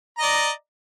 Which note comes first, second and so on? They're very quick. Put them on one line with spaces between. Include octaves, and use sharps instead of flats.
A#5 D#5 D5